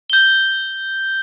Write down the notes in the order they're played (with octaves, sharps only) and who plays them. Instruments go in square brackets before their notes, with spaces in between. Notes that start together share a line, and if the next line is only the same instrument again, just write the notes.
[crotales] G6 G7